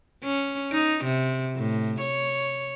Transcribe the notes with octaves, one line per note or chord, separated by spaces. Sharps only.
C#4
D#4
C3
A2
C#5